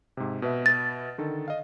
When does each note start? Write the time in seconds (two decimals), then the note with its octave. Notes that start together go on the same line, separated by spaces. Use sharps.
0.17 G#2 C3
0.42 B2 B4 E5
0.66 A6
1.18 D3 D#3 A4
1.48 D#5 F5